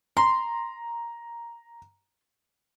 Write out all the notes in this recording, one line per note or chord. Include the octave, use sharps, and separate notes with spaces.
A#5 C6